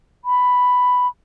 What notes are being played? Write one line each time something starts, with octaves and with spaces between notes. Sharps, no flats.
B5